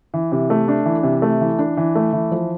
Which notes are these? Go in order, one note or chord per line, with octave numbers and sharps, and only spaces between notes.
E3
C3
A3
D4
E3
C3
A3
E3
D4
E3
A3
E3
F3